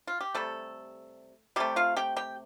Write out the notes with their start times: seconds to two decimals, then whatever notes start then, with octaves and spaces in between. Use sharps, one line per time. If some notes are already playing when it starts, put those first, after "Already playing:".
0.07 F4
0.21 G4
0.35 C3 G3 A3 A4
1.56 C3 G3 A3 G4
1.76 F4 F5
1.97 G4 G5
2.17 G4 G5